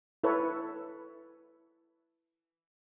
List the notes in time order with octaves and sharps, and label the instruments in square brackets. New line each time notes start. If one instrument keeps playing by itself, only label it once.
[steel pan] E4 A4 B4 C#5